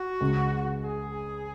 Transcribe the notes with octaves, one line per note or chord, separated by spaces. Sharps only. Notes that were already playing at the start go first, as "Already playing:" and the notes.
Already playing: F#4
C#2 C#3 G#3
G#4